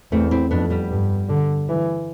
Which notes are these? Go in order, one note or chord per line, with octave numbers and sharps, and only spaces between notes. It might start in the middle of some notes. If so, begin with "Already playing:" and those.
E2 A3 C4
C4 E4
F2 B3 D4
G3 B3
G2
D3
E3